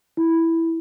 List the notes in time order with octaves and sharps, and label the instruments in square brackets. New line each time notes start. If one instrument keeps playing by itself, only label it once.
[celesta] E4